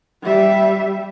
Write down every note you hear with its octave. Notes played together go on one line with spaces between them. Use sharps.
G3 E5